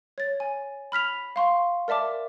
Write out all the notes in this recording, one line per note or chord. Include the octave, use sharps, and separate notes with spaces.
C#5 A6
G#5
B5 F6 B6 F7
F5 C6 C#6
A#4 D5 E5 A5 D6